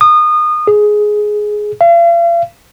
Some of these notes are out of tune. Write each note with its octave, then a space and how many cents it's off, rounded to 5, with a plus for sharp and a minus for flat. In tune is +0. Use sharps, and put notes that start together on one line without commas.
D#6 -25
G#4 +10
F5 -40